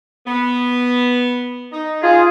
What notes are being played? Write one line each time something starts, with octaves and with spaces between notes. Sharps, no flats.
B3
D#4
F4 G#4